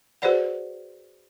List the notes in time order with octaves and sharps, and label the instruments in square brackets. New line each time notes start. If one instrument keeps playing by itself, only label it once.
[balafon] F#4 G#4 B4 C5 D5 F#5